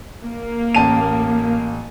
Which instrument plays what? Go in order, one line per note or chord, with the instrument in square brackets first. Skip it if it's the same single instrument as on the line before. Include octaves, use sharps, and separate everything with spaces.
[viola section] A#3
[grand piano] A1 A5 D#7